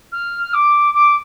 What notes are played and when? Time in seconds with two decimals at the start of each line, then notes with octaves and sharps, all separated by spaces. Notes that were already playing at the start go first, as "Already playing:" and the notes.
0.12 F6
0.53 D6
0.94 D6